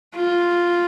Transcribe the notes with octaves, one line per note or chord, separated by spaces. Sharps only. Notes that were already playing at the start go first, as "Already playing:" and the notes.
F4